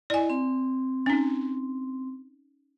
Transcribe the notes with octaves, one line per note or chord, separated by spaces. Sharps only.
E4 D5 D#5 G#5
C4 C6
C#4 D#4